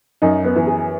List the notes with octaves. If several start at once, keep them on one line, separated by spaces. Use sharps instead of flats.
F#2 D#4
B3
E3
G#4